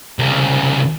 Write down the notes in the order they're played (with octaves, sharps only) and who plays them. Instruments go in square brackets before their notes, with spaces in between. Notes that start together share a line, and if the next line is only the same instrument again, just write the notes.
[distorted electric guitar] C2 C#3